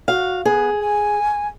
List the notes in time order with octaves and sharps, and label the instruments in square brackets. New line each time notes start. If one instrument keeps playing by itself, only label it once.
[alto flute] F#4 [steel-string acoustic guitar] F5
[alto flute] B3 [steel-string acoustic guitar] G#4
[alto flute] G#5